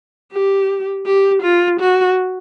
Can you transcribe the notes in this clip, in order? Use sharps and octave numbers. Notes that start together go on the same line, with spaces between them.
G4
G4
F4
F#4